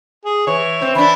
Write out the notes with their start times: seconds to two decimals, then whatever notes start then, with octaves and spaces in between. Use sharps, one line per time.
0.25 G#4
0.47 E3 C#5
0.82 C4
0.95 E3 D4 B5